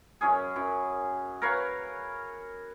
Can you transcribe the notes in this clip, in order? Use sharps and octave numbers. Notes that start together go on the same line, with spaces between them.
F#2 C#4 G#4
F#2
A#4 B4 C#5 F5